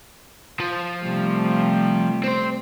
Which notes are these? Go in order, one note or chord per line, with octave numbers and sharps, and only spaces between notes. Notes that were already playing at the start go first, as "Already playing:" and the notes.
F3
C3 G3 A3
C4 C5